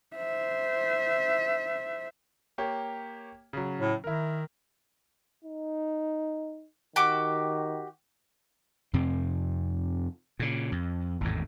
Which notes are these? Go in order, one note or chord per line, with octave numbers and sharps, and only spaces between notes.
C5 E5
A#3 G4 C#5
C#3 F#3
A2
D#3 E4 A#4
D#4
D#3 F#4 G4 D6
F2 C3 C4
A#2 C#3
F2
G#1 E2 A2